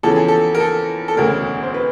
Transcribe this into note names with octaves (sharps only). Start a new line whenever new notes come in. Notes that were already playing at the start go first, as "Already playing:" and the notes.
E2 C#3 F3 A4
G#4
A4
A#4
A4
A4
E1 D2 C#3 A#4
C5
B4